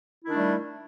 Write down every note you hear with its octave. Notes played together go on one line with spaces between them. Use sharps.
D#3 G3 A3 D4 E4